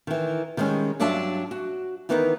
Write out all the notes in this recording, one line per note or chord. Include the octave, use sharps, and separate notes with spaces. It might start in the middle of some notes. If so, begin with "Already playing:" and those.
D#3 E3
D#3 G3 G#3 A#3 C#4
G2 F#3 D4 F4 E5 A5
F#4
D#3 E3 B3 D#4 A#4 B4